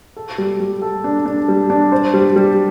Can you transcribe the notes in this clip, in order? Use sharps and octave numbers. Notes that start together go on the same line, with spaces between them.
A4
G3
G3
A4
D4
D4
G3
D4
C5
G3
G3